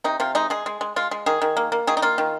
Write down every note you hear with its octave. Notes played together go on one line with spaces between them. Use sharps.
C3 D#4
C3 F4
G#3 D#4
G#3 G#4
G#3
G#3
G#3 F4
G#3
D#3 G#4
D#3
A#3
A#3
D#3 G#4
D#4
A#3 F4
D#3